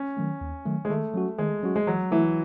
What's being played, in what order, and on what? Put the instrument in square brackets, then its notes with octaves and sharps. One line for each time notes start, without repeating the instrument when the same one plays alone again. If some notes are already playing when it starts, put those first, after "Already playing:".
Already playing: [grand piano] C#4
[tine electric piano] D#3 F#3 A3
D#2
D#3 F#3 A3
[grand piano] G#3
[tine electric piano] D#3 [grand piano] A3
[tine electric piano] F#3 C#4 F#4
[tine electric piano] D#3 [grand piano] G#3
[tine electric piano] F#3 C#4 F#4
[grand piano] G#3
[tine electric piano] E3 [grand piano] F#3
[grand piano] E3 [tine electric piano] A3 E4